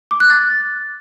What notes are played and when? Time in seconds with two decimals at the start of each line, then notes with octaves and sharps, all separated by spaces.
0.11 D6
0.20 F#6
0.30 A6